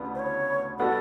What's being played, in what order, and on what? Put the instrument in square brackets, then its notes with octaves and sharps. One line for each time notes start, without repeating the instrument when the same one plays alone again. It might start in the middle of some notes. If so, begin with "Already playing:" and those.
Already playing: [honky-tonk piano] D2 C#3 E3 G3 B3
[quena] C5
C#5
[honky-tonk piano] G3 B3 D4 F#4 [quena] A4